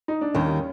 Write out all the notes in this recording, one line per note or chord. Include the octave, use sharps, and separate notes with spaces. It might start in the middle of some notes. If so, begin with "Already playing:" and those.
D#4
D4
D#2 D#3 G3 C#4